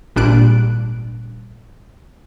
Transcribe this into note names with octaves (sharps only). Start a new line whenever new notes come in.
G#1 A#2 G3 D4 F#6 D7